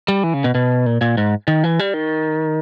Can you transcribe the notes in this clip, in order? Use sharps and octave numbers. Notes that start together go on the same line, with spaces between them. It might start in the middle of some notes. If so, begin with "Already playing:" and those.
G3
E3
C#3
B2
B2
A#2
A#2
G#2
D#3
E3
G3
D#3